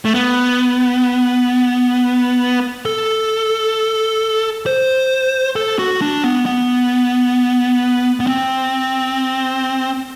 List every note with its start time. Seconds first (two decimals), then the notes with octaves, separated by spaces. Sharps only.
0.05 A3
0.15 B3
2.85 A4
4.66 C5
5.56 A4
5.79 F#4
6.01 D4
6.24 B3
6.46 B3
8.20 B3
8.27 C4